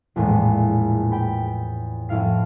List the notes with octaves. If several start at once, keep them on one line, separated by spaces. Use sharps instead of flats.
A#1 E2 A2 G#3
G5 B5
F2 A2 E4 F5 C7